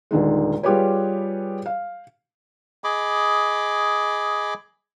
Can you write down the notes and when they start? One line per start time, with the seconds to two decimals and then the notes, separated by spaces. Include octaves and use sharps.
0.11 D#1 D3 D#3 G#3
0.63 G3 F4 G4 G#4 B4 C#5
1.66 F5
2.84 G#4 D#5 B5 D6